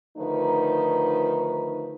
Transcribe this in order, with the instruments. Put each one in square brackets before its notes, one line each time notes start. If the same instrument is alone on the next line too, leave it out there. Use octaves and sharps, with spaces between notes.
[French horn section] D3 D#3 F3 A3 D#4 B4